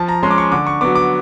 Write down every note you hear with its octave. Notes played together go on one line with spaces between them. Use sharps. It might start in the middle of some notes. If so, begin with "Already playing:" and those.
Already playing: F3 A5
A#5
G#3 C#4 C6
D6
C#6
D3 D6
C#6
F#3 B3 D6
D6